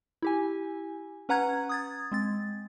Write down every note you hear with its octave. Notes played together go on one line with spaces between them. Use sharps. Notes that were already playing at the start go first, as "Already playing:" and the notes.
E4 G4 G#5
C#4 B4 F#5 A#5 F#6 G#6
D#6 G#6 A6
G#3 C4 A6